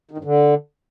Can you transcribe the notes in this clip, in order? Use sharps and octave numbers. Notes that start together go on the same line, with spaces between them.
D#3
G2
D3